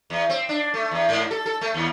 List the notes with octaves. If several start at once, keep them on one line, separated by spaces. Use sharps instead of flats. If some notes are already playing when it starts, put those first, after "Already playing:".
E2
C4
D4
A3
E2
G#2
A4
A4
A3
D#2